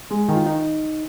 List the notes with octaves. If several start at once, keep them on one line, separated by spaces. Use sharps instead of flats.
G#3
D#3
F4
D#4